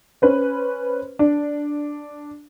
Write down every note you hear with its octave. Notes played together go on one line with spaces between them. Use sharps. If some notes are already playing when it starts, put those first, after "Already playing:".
C#4 B4 C5
D4